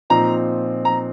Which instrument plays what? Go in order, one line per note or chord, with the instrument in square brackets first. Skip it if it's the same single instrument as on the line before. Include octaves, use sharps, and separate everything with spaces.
[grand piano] A#2 F3 C4 D#4 [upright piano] A#5
[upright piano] A#5